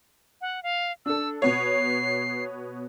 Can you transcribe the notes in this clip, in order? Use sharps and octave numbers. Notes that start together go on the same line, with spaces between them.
F#5
F5
D4 A4 E6
B2 B3 C#5 C7